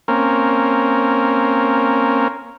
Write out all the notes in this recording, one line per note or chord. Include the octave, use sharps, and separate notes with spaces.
A#3 C4 C#4 A#4